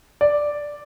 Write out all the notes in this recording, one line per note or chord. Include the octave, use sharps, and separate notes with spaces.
D5